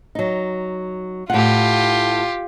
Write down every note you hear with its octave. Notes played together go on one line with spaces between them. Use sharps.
F#3 D#4
A2 F4 G4 F#5